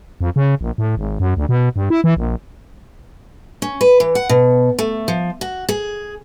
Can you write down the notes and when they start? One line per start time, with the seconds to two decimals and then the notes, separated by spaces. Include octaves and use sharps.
0.21 F2
0.36 C#3
0.61 A#1
0.78 A2
0.97 G#1
1.20 F#2
1.37 D2
1.49 B2
1.76 G2
1.90 E4
2.04 E3
2.17 A#1
3.62 C#4
3.81 B4
4.00 E3
4.15 F#5
4.29 B2
4.79 A3
5.08 F3
5.41 F#4
5.69 G#4